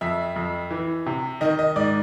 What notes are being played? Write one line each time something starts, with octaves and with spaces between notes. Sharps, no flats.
F2 E5
F2
E3
C3
D#3 D#5
D#5
G#2 D5